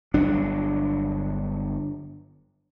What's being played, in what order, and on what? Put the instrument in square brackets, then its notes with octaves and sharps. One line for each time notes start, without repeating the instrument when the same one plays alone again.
[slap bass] G1 F#3 D4